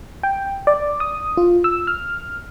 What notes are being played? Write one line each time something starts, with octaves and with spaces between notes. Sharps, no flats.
G5
D5
D#6
F4
E6
F6